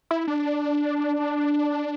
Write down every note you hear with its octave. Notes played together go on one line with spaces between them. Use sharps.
E4
D4